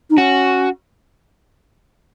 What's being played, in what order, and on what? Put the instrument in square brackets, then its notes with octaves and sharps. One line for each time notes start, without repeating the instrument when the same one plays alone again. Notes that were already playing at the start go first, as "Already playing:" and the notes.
[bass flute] D#4
[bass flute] C#4 [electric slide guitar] F#4